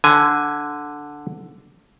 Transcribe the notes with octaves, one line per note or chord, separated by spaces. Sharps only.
D3 G#5